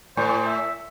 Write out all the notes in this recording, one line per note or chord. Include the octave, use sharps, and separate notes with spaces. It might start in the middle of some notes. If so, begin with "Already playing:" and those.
A2 C5
E5